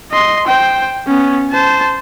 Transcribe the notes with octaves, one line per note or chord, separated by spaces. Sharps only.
D#5 C6
C5 G5
B3 C#4
C5 A5